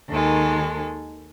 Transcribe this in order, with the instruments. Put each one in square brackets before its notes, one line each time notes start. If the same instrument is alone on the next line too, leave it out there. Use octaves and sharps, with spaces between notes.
[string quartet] D#2 D#3 G#3 A4